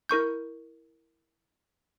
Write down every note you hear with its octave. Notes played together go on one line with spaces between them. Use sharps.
E4 A#4 C#6 G6